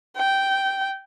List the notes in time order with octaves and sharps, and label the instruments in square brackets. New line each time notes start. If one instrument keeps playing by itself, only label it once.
[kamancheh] G5